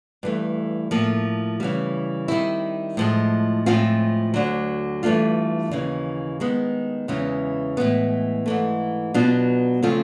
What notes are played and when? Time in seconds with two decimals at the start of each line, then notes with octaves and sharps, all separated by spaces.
0.23 G2 E3 A3
0.91 A2 F3 A#3
1.60 C#3 E3 G3
2.28 D#3 G3 C4 E4
2.97 A2 F3 G#3
3.66 A2 F3 G#3 C4 F4
4.34 D2 D3 F#3
5.03 G2 E3 A3 D4 F4
5.71 D#2 C#3 E3
6.40 D#3 G#3 B3
7.08 E2 C#3 E3 G#3 C#4
7.77 A2 E3 G#3 B3
8.46 G#2 E3 A3
9.14 B2 F#3 B3 D4 F4
9.82 C#3 F3 A3 C4 F4